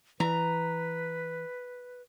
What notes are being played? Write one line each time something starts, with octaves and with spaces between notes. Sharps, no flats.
E3 B4 A#5